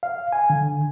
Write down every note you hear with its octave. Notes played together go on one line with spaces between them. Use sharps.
F5
G#5
D3